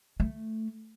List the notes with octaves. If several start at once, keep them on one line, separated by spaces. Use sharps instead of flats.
A3